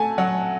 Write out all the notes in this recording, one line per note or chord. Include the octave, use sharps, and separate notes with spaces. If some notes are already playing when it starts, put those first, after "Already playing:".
Already playing: A3 F#4 G#5 A5
F#3 F#5